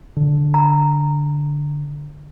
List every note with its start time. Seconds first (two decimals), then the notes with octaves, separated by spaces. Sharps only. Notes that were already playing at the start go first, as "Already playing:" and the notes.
0.17 D3
0.54 A#5